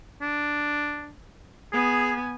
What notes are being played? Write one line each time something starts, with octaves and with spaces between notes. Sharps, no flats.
D4
B3 G#4 G#5